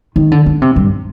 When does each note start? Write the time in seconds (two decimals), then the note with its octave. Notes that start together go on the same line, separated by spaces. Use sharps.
0.16 D#3
0.32 D3
0.46 D3
0.62 C3
0.76 G2